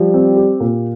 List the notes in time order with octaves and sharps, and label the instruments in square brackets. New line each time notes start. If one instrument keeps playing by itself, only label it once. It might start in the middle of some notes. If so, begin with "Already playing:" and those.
Already playing: [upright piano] F3 [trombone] G3
[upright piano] C4
G4
A#2